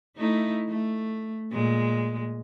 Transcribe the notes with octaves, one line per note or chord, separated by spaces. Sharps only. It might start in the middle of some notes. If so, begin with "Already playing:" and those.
A3 D#4 E4
A3
A#2 G#3